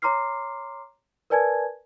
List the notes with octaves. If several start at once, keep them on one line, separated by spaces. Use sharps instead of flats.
C#5 A#5 C6 D6 F6 C7
A#4 B4 D5 G#5 A5 G#6